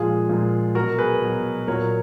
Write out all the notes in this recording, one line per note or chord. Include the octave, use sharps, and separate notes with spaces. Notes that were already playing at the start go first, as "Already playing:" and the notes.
Already playing: A#2 F3 G#3 F4 G#4
A#2 F3 G#3
B2 F#3 F#4 A#4
G#4 B4
B2 F#3
A#2 F#3 A#4 C#5